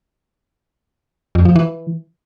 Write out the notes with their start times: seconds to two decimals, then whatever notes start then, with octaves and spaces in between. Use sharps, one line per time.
1.35 F2
1.45 F3
1.56 E3